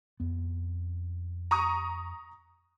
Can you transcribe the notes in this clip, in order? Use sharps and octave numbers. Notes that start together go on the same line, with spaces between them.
F2 B3
A#5 C#6 D#6